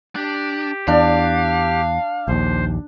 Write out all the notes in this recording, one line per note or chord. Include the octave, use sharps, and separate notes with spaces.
D4 G4
E2 D4 F5
A#1 D#2 C5